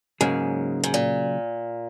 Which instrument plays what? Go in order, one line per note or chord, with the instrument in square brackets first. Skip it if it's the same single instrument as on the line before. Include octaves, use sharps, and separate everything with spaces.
[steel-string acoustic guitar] G#2 [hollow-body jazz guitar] C#3 F#3 A#3 C#4 G#4
[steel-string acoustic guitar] G#2
A#2